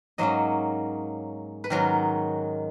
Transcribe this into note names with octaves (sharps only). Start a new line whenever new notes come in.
G#2 F#3 A#3 C#4 D#5
B4
G#2 D#3 F#3 C#4 A#4